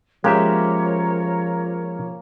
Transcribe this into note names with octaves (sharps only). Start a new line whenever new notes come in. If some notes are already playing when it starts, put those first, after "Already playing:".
F3 G#3 A#3 C#4 G4 A#4 C#5 E5